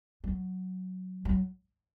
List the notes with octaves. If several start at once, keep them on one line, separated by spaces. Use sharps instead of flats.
F#3
F#3